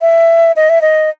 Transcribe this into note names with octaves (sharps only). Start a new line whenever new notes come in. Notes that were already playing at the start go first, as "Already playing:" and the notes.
E5
D#5
E5
D#5